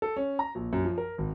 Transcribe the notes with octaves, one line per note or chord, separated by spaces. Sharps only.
A4
C#4
A#5
A#1
F#2
F3
A#4
G#1